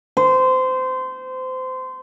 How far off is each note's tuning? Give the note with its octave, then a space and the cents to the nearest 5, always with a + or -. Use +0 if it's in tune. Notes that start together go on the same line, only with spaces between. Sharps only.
C5 -25